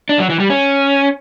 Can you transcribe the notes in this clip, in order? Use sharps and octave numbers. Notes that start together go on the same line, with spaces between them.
D4
F#3
E3
G3
C#4